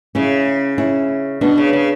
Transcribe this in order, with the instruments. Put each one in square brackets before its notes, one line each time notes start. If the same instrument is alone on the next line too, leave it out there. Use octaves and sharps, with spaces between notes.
[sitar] C#3 [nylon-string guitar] C#4 E4
[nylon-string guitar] C#4 E4
[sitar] B2 [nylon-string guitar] B3 D4
[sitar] C#3
C#3